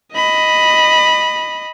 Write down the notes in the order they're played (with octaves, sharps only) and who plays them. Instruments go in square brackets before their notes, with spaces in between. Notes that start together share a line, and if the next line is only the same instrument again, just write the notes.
[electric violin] D#5 B5